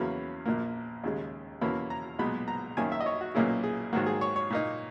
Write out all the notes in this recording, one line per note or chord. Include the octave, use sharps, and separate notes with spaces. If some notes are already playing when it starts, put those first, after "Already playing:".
Already playing: E2 C#3 F#3 A#3 C#4 B5
A#1 A#2 A#3
D#2 C#3 G#3
E2 B2 A#3 C#4 E4 B5
A#5
B1 A#2 G#3 B3 B5
A#5
F#2 D#3 A#3 C#4 G#5
E5
D#5
C#5
F#4
B1 A#2 A#3 C#4 E4 G#4
G#4
G#2 D#3 F#3 A#3 F#4
G#4
C#5
C#5
A#2 A#3 D#4